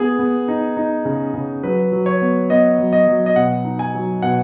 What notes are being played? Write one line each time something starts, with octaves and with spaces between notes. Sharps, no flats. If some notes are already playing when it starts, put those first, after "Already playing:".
Already playing: B3 G#4
B3
D#4
D#4
C#3
C#3
F#3 B4
F#3
C#5
B3
B3 D#5
F#3
D#5
F#3
D#5
B2 F#5
D#4
G#5
F#3
B2 F#5